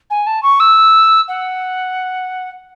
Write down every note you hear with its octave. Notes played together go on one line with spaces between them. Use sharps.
G#5
A5
C#6
E6
F#5